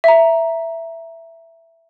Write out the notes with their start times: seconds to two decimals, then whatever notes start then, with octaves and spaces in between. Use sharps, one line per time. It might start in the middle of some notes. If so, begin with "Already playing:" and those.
0.04 E5 A#5